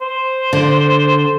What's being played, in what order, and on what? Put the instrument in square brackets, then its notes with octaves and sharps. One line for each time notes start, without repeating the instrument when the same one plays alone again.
[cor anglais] C5
[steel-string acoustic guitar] D3